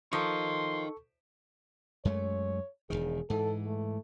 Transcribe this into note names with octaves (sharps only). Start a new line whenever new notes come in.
F3 D#4 A4 A#4 C6 C#6
F#2 G#3 A3 C#5
E1 C2 D#3 G#4
G#2 E3 A4
A3